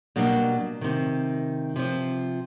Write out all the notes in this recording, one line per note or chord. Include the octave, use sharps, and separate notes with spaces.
B2 F#3 G3 A#3 D4
C3 D#3
C3 F3